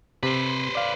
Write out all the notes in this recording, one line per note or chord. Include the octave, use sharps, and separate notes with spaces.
C3 B4 C5
D5 F5